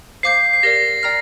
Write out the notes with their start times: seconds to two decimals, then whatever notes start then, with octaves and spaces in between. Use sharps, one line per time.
0.23 C5 F5 D6 G6 C7
0.53 C7
0.63 G4 A#4 D5 A#6
1.03 D5 G5 A#5 F6